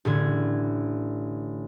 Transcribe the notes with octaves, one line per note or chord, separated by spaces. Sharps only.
A1 A2 D3 G#6